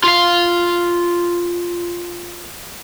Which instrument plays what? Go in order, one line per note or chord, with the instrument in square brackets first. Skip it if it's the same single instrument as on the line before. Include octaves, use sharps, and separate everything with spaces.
[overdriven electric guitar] F4 F5